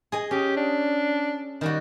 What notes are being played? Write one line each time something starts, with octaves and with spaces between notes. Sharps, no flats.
G#4 D#5
C#4 G4
D4
D#3 G3 F#4